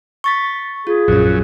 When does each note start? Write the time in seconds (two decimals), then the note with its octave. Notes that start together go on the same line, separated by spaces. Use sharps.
0.24 C#6 A6 B6
0.87 F4 G#4
1.08 A#1 F#2 C#4